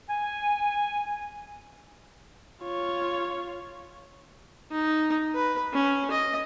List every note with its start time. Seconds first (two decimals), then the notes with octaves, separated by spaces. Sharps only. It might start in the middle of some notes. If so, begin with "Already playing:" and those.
0.10 G#5
2.63 F4 C#5
4.71 D#4
5.35 B4
5.73 C#4
6.11 D#5